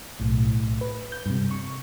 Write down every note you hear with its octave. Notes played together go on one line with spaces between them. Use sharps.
B1 A2
B4
G6
G2 C3
C#6